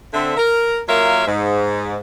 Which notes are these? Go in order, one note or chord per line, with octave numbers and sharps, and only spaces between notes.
D3 C4 E5
A#4
F#3 A#3 F4 A#4 E5 F5
G#2